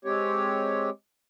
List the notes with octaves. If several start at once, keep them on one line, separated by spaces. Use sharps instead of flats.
G#3 C4 G4 C#5